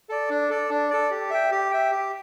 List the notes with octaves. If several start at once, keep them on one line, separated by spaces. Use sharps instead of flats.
A4 D5
D4
A4 D5
D4
A4 D5
G4
E5 G5
G4
E5 G5
G4